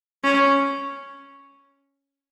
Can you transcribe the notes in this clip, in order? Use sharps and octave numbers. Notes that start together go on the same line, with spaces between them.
C#4